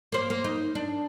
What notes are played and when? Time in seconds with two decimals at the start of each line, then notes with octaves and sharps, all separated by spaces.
0.12 A#3 C5
0.30 A#3
0.44 D#4
0.75 D4